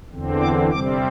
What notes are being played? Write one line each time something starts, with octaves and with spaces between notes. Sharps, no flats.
E2 D3 C4
D6
C3 G3 C4 D6